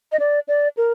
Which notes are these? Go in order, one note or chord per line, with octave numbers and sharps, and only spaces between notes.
D#5
D5
D5
A#4